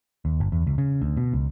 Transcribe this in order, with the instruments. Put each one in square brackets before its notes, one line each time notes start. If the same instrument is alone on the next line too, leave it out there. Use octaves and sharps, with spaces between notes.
[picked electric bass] D#2
G1
E2
C#2
C#3
D2
B2
C#2